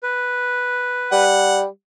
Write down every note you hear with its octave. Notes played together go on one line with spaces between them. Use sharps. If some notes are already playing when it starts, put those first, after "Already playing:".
B4
G3 F#5